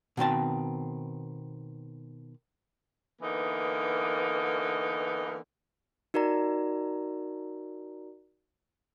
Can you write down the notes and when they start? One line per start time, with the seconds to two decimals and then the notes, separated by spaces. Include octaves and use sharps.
0.17 B2 D#3 C4 A5
3.21 D3 E3 A#3 B3 D#4
6.14 D#4 F#4 A#4 D5 A#5